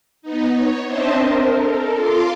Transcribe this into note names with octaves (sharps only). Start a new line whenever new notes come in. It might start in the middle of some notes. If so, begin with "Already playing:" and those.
B3 D#4
C#5
C4 D4 C5 D#5 E5 A5
A#4
A4 A#4
F4 C6 D6